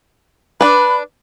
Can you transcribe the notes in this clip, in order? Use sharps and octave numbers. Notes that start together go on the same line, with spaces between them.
D4 B4 B5